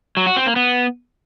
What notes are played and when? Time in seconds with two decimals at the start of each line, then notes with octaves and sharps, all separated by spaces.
0.17 F#3
0.27 F#4
0.36 C4
0.46 A#3
0.56 B3